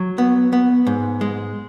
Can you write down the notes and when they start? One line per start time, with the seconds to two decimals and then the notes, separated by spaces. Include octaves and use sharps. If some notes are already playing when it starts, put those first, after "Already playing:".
Already playing: F#3
0.18 B3
0.53 B3
0.87 G#2
1.21 G#3